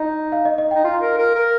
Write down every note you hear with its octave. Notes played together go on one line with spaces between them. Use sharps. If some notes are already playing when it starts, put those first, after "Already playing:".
Already playing: D#4 D#5
F5
D#5
D#5
D#4 G5
F4 F5
A#4
A#4
A#4